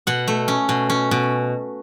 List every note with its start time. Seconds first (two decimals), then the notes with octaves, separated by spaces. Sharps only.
0.07 B2 F#5
0.28 A3
0.48 C#4
0.69 B2
0.90 C#4
1.11 B2